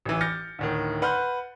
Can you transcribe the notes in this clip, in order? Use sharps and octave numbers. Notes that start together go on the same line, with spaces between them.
A1 E3
D6 F6 G6 A6 A#6 C#7
D2 A2 D#3
B4 F#5 C6 F6 G6